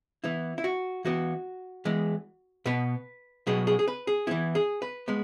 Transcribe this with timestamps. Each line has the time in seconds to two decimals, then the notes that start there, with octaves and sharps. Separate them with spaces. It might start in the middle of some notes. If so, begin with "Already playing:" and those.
0.24 E3 B3 E4
0.58 E4
0.64 F#4
1.05 E3 B3 F#4
1.85 E3 G#3 B3
2.66 B2 B3 B4
3.47 B2 F#3 B3 G#4
3.67 G#4
3.79 G#4
3.88 B4
4.07 G#4
4.27 E3 B3 E4
4.55 G#4
4.82 B4
5.08 G#3 B3